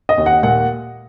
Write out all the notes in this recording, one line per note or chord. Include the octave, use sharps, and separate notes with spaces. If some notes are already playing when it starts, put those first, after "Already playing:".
D#5
D#2
F#5
A#2 F#5